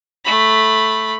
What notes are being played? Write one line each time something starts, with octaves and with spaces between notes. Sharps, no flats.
A3 B5